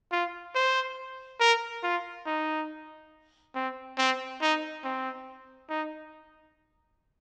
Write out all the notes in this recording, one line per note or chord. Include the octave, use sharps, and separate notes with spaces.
F4
C5
A#4
F4
D#4
C4
C4
D#4
C4
D#4